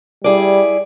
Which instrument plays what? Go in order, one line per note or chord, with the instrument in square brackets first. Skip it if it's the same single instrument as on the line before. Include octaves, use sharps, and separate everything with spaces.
[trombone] G3 [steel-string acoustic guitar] E4 G#4 D5